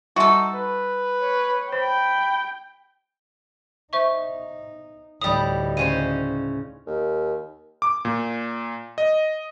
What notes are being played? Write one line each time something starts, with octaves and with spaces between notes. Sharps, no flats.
G3 D#4 F#4 A4 E5 C6
B4
C#5
C5 G5 B5
D#4 C5 E5 C#6
D2 A2 G3 D#4 D#6
C#3 C#4 C5 D#7
D#2
D6
A#2
D#5